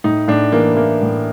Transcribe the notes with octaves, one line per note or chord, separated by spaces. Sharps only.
A2 D#4
A2 D4
E3 A#3
E3 A#3
A2